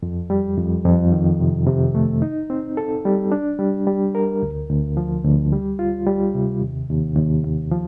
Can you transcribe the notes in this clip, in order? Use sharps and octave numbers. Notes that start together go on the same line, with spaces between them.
F2
G3
F2
F2
D#3
C3
C3
A3
D#4
C4
A4
G3
D4
G3
G3
A#4
D2
D2
F3
D2
G3
F4
G3
C3
D#2
D#2
D#2
D#2
F3